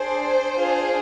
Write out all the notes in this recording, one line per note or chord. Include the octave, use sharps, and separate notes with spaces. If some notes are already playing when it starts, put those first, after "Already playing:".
Already playing: D4 G#4 C5
D4 F4 G#4